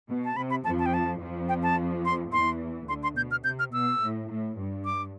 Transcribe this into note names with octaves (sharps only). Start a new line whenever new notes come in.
B2
A5
C3 B5
B5
F2 F3 A5
A5
G5
A5
F2 F3
G5
A5
C6
E2 E3 C6
D2 D3 C6
C6
B2 G6
F6
C3 G6
F6
B2 E6
A2
A2
G2
D6